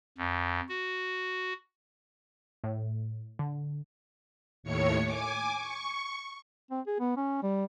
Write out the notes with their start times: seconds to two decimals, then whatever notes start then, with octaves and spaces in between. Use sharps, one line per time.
0.18 F2
0.69 F#4
2.64 A2
3.39 D3
4.63 D#2 A2 C#5 C#7
5.03 G#5 D6
5.56 C#6
6.71 C4
6.87 G#4
6.99 B3
7.17 C#4
7.43 G3